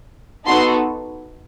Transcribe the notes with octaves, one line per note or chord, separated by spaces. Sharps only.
B3 D#4 F#4 A4 C6